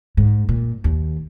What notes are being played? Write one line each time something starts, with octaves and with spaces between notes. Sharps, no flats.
G#2
A#2
D#2